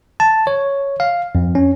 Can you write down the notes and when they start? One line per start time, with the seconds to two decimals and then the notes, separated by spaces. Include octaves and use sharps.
0.20 A5
0.47 C#5
1.00 F5
1.35 F2
1.55 C#4